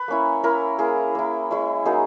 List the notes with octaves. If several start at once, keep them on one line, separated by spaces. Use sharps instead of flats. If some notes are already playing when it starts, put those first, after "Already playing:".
Already playing: B4
A#3 C#4 E4
A#3 C#4 E4 A#4
A#3 E4 G#4
A#3 E4
G#3 C#4 E4
F#3 A#3 D#4 G#4